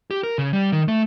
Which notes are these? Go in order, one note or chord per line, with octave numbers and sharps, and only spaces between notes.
G4
A#4
C#3
G3
D#3
A3